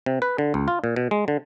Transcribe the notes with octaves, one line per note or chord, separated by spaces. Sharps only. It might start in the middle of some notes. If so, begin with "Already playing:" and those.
C3
B4
D3
C#2
F4
A#2
B2
G#3
D3